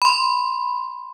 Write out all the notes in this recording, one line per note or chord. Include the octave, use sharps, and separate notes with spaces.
B5 C6